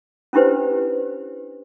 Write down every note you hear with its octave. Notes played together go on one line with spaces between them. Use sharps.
C#4 D4 E4 G4 B4 C5